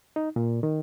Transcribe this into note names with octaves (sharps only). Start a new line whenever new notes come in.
D#4
A#2
D#3